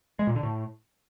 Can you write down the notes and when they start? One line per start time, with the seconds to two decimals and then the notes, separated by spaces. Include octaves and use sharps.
0.19 G#3
0.27 A#2
0.35 D3
0.43 A2